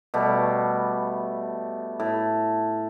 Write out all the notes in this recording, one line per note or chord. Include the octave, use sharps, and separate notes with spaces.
B2 G3 A3
A2